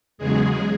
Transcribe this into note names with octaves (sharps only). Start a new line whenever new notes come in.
E2 C#3 F#3 G#3 G#4